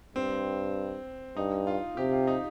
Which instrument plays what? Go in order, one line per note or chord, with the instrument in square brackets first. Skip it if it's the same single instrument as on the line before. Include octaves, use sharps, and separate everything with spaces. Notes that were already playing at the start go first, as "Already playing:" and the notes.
[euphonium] G2 [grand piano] C4
[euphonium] G2 [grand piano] D#4
[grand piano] F4
[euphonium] C3 [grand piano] G4
[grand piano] F4
D#4